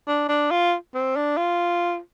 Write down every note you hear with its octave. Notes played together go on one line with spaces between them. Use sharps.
D4
D4
F4
C4
D4
F4